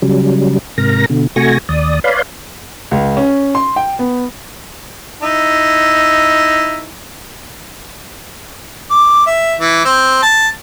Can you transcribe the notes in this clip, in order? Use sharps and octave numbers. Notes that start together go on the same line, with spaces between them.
C#3 F#3 G3
G#2 C3 A#4 A#5 A#6
B2 D3
C3 A3 F#4 G#5 C#6 A#6
D#2 D5 D#6
B4 C#5 D5 F5 B5 C6
C#2
C#4
C6
G5
B3
D#4 E4
D6
E5
E3
C4
A5